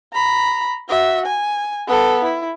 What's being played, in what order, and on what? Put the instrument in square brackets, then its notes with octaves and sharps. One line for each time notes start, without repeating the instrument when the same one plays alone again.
[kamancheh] A#5 B5
F#4 E5
G#5
B3 A4
E4